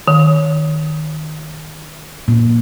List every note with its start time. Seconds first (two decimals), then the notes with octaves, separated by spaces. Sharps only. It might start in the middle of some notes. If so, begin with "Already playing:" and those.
0.08 D#3
2.28 A#2